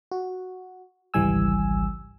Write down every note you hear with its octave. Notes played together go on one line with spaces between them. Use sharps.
F#4
G#1 C#2 E3 G3 G#5 E6